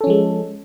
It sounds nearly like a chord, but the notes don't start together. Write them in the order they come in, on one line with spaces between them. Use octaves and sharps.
A4 C#4 F3 G#3